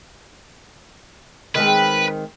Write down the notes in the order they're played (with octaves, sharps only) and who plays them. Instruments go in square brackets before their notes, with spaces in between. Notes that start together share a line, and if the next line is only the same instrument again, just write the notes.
[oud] D#3 G#3 C4 [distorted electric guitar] B4